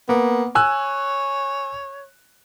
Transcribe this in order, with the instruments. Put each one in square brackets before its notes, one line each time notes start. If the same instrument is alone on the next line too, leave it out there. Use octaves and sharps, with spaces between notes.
[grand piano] A#3 [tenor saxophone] B3
[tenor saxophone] C#5 [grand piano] G#5 E6 F#6